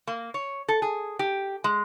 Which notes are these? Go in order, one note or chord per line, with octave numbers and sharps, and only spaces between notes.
A#3
C#5
A4
G#4
G4
G#3